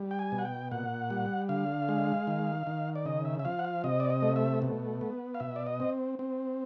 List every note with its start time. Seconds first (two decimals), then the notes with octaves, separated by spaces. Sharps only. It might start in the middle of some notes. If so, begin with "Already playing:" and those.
Already playing: G3
0.11 G5
0.19 G#5
0.32 B2
0.38 F#5
0.45 G5
0.71 A#2 F#5
1.10 G3
1.49 D3 F5
1.89 G#3
2.27 D#3
2.67 D#3
2.95 D5
3.05 C#3 D#5
3.25 E5
3.39 E5
3.45 F3 F5
3.59 F#5
3.64 F5
3.84 C3 D#5
4.00 D5
4.10 D#5
4.22 A3
4.36 E5
4.62 B2
5.01 B3
5.34 F5
5.40 B2 E5
5.56 D5
5.66 D#5
5.80 C4
6.19 C4